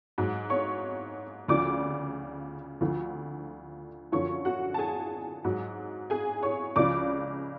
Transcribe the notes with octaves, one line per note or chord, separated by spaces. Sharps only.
G#2 F#3
C#5 C#6
D2 C#3 F3 D5 D6
D2 D3 F3
F#2 D3 F3 C#5 C#6
F#4 F#5
A5
G#4 G#5
G#2 F#3
G#4 G#5
C#5 C#6
C#2 C#3 F3 D5 D6